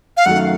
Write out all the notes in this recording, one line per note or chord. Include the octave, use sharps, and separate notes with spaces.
F5
F#2 D#3 F#3 A3 F#5